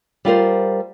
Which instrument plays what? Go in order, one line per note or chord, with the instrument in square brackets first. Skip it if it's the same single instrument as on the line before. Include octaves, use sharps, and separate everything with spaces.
[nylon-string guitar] G3 F4 A#4 C5